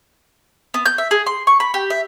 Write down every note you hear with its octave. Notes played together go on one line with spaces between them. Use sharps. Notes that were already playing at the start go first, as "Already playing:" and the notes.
B3
G6
E5
G#4
C6
C#6
B5
G4
E5